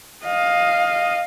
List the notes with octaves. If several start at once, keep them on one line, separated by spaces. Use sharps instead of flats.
D#5 F5